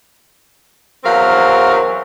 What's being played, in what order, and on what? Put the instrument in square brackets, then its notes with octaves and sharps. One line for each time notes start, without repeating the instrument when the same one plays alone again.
[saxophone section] E2 F#3 C4 A#4 F5